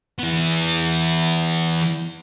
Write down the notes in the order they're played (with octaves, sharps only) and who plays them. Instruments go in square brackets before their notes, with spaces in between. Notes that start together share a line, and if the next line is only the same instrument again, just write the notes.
[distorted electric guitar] E3 B3